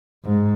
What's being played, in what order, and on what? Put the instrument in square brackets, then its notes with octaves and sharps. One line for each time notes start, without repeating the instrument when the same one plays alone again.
[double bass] G#2